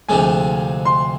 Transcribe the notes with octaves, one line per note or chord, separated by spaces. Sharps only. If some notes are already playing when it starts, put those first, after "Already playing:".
D2 C3 F3 G#3 G#5
C6